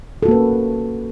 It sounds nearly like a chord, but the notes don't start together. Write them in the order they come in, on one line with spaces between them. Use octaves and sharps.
A4 F#4 A#3 B4 C#4